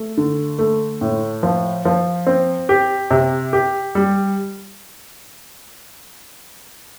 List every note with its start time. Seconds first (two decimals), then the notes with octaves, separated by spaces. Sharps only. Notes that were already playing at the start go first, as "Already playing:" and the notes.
Already playing: A3
0.17 D3
0.59 A3
1.01 A2
1.43 F3
1.85 F3
2.26 C4
2.69 G4
3.11 C3
3.53 G4
3.95 G3